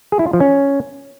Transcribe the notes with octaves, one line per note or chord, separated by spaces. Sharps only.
G#4
E4
F4
F3
C#4